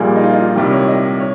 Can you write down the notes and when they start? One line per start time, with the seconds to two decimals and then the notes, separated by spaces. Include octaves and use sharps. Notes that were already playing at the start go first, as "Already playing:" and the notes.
Already playing: A#1 A#2 G3 A#3 G#4
0.16 D#4
0.23 F4
0.33 D#4
0.39 F4
0.55 C2 C3 D#3 G3
0.72 C#5
0.88 D#5
1.20 C#5